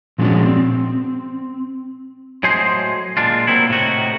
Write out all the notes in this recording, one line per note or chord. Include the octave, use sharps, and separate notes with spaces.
A#2 F3 G#3 C#4 D4 F#4
C4
A2 F#3 G#3 G#4 C5 C6
A#2 G#3 D4 F4
F#3 G3 A#3 C4 D4 E4
A2 C3 D#3 F#4